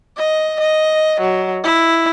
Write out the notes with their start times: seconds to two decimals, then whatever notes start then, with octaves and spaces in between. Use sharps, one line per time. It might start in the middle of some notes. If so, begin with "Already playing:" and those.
0.18 D#5
0.60 D#5
1.20 F#3
1.64 E4